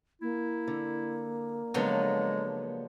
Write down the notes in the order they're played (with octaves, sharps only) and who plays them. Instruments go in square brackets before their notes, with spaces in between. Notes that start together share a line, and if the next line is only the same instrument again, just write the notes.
[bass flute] A#3 [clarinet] E4
[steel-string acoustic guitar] D3
[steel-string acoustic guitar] C#3 B3 D4 [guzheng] F3 F#3 A4 [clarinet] G#3